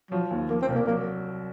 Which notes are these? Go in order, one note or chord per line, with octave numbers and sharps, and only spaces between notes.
F3 F#3
D#2
F3 A#3
C4
C2
A#3
F#3 A#3